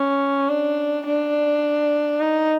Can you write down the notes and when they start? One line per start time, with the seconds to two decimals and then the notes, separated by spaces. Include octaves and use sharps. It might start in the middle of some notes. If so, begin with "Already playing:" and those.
Already playing: C#4
0.49 D4
1.06 D4
2.20 D#4